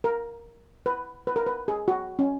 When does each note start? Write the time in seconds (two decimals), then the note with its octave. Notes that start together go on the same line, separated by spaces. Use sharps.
0.04 A#4
0.86 B4
1.27 B4
1.36 A#4
1.46 B4
1.68 G#4
1.88 F#4
2.19 C#4